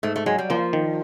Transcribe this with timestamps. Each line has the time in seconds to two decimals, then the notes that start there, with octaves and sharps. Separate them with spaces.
0.03 G#2 A3
0.16 A3
0.26 F#3 G#3
0.38 G3
0.50 F3 A#3
0.73 D#3